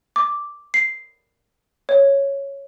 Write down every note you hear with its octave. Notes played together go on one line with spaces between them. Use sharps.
D6
C7
C#5